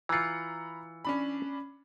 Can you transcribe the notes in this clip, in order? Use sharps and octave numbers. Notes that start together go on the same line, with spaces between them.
E3 F4 A#5 B5 C#7
C#4 D4 B5